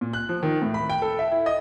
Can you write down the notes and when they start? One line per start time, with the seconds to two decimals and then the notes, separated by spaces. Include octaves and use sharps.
0.01 A#2
0.13 F#6
0.29 F3
0.43 D#3
0.62 A2
0.74 B5
0.90 G5
1.02 A4
1.19 E5
1.31 E4
1.46 D#5